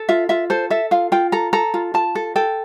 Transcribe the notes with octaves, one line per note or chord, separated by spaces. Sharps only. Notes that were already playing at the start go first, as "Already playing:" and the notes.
Already playing: A4
F4 E5
F4 E5
A4 C5
A4 E5
F4 F5
F4 G5
A4 A#5
A4 A#5
F4
F4 A5
A4
A4 G5